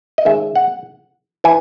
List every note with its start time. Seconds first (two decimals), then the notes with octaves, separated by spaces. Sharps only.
0.18 D#5
0.25 D#3 G#3 C#4 E5
0.55 F#5
1.44 E3 G#5